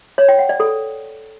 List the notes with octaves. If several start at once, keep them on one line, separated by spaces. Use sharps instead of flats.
C#5
G5
F#5
D5
A4